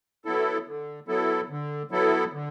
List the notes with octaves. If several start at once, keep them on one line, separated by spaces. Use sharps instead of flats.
F#3 B3 E4 A4
D3
F#3 B3 E4 A4
D3
F#3 B3 E4 A4
D3